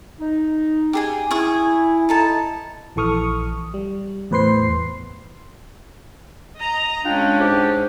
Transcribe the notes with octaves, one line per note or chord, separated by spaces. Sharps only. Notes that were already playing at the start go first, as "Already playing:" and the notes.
D#4
G4 G#4 G#5
E4 G#4 C#6 D#6
D#4 A4 A5
A#1 E3 A4 C#6 D#6 F6
G3
E2 A2 B4 C5 C6 C7
D#5 A#5
G#3 C#4 D4 F4 G5
G#2 G4